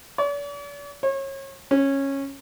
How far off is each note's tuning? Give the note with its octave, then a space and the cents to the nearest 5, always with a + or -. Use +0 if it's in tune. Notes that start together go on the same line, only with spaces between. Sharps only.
D5 -45
C#5 -30
C#4 -15